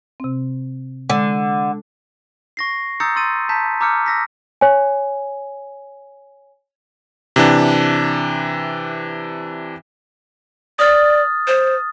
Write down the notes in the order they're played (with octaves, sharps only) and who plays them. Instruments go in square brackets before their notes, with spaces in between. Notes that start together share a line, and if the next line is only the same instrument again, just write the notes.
[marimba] C3 C4
[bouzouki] D3 [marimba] G#3
[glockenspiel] C#6 A#6 C7
A#5 D#6 E6 G6 A6 C#7
C6 E6 A6 D#7
A5 A#5 G6 B6
A#5 D6 E6 F6 G6 C#7
E6 A#6 B6
[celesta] C#5 G#5
[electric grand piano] C3 E3 D4
[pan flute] D5 [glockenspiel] D#6 F6 A6
[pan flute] C5